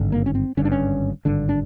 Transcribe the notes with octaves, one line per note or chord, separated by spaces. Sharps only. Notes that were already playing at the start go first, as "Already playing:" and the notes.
Already playing: G#1 G2 D3
A#3
C#4
C4
G#1 G2 D3 C#4
D4
C#4
G#1 G2 D3 D4
D4